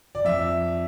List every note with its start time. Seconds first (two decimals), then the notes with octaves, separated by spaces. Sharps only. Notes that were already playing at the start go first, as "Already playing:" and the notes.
0.15 D5
0.24 F2 E5